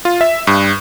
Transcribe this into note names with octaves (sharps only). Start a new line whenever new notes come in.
F4
E5
G2